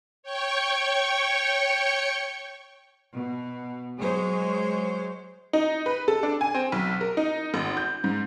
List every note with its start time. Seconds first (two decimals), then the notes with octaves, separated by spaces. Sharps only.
0.23 C#5 G5 C#6
3.16 B2
3.98 F#3 G#3 C5 C#5
5.53 D#4
5.86 B4
6.08 A4
6.23 D4
6.41 G#5
6.54 C4
6.72 B1
7.01 A#4
7.17 D#4
7.54 G#1
7.77 G6
8.04 G#2